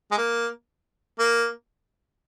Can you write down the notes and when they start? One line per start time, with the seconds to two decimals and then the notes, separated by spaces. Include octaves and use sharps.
0.12 G#3
0.18 A#3
1.19 A#3